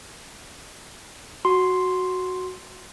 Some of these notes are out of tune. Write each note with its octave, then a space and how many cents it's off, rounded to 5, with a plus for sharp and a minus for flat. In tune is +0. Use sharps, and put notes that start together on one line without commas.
F#4 +0 C6 +0